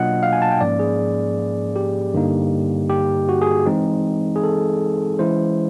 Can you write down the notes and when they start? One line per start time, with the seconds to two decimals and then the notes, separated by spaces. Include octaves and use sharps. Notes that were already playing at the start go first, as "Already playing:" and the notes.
Already playing: B2 F#3 A#3 D4 F4 D#5 F#5
0.23 F5
0.33 G#5
0.42 A5
0.52 G5
0.61 G#2 F3 A#3 C#4 D5
0.79 G#4
1.76 G4
2.14 G2 D3 G3 A#3 D#4
2.90 G4
3.29 F#4
3.42 G#4
3.66 E3 G#3 C4 D#4
4.36 G#4
4.43 A4
5.19 E3 G#3 C#4 E4 C5